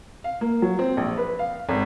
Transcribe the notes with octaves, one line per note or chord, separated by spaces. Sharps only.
F5
A#3
F#3
C4
A#1
B4
F5
G#1